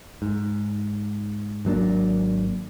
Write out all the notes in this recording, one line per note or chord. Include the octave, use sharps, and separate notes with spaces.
G#2
G#1 F#3 A#3 D4